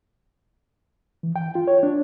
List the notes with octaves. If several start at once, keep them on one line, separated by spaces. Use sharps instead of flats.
E3
G5
F4
C#5
D4